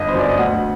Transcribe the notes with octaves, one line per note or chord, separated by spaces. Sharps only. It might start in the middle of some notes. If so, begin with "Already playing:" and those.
Already playing: G1 D#5
C5
F#2 F#3 D5
D#5
D2 F#5